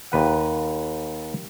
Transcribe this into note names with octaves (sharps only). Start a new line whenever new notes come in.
D#2 B4 F#5